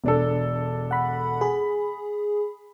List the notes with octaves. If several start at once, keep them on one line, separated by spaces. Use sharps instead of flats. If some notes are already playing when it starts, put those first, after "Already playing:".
E1 D4 A4
F#5 B5
G#4 B5